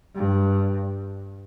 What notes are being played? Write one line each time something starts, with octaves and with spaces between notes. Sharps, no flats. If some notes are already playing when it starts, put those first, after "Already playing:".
G2